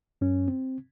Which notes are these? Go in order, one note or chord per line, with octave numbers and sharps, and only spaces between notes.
F#2 C#4
C4